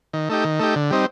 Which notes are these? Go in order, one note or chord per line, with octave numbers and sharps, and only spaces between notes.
D#3
A3 D#4 G4
D#3
A3 D#4 G4
D3
G3 C4 D#4